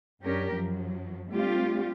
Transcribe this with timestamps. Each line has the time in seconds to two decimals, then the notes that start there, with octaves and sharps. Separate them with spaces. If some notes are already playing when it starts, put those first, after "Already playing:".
0.23 F#2 C#4 D4 G4 A#4
0.54 F#2 F3 F#3
1.31 G3 A3 C4 D4 F4 G4